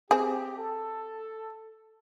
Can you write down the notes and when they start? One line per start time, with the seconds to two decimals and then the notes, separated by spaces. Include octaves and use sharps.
0.11 C4 G4 G#4
0.58 A4